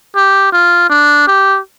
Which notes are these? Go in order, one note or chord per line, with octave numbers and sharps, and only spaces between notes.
G4
F4
D4
G4